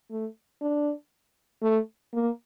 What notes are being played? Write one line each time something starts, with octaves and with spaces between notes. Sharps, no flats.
A3
D4
A3
A#3